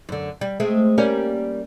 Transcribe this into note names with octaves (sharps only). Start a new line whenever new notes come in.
F#2 D3
G3
G#3 A3 C4
G3 A#3 C#4